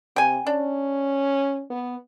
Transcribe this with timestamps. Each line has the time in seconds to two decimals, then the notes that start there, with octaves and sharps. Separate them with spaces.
0.16 C3 G5 G#5
0.47 C#4 D4
1.70 B3